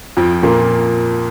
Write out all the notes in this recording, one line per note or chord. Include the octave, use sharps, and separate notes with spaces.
F2 F3
A#2 A#3